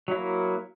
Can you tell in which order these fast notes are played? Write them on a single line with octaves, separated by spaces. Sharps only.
F#3 E4 A#3